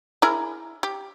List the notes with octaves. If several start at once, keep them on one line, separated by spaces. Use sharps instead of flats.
E4 G#4 A#4
G4